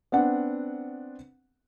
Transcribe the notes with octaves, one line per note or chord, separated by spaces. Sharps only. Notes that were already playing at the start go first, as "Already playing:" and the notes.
B3 C4 D4 F#5